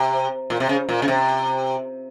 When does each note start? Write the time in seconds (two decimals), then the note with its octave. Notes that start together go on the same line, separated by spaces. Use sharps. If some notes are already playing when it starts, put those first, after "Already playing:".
Already playing: C3
0.50 A#2
0.60 C3
0.69 C#3
0.89 A#2
1.02 C#3
1.08 C3